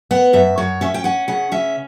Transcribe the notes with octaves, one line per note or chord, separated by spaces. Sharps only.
B3 F#5
F#2 E5
F#2 C#5
C#4 E5
G5
C#4 F#5
C#3 F#5
C#4 E5